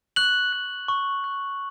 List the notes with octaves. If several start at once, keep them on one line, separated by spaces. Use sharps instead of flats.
C#6 F#6 F#7
F#6
C#6
F#6